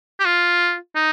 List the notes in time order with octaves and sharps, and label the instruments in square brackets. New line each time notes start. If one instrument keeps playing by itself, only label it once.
[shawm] G4
F4
D#4